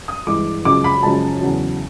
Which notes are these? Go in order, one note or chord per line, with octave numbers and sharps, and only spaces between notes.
D#6
G2 E3 G#3 D6
F#2 C#3 F3 G#3 D6
B5
F#2 C#3 F3 G#3 A5
E2 C#3 F#3